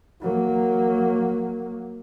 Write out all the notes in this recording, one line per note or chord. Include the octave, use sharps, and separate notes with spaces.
F#3 A#3